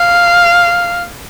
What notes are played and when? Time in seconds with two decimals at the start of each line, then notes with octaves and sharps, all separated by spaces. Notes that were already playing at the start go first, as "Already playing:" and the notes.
Already playing: F5